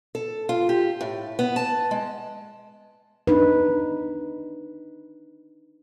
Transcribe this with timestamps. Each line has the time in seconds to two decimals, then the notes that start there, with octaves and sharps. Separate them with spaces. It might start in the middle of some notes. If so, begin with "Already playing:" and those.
0.15 A4
0.49 F4
0.69 G4
1.01 A2
1.39 B3
1.56 A5
1.91 G#3
3.27 D4 D#4 B4